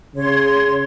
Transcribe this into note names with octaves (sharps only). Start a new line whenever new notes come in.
C#3 C#5 C6